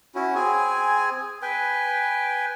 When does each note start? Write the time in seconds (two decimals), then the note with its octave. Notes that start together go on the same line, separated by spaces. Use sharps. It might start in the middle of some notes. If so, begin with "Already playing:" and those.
0.15 C#4 E4 F#4
0.35 C4 G#4 G#5
1.42 B4 G5 G#5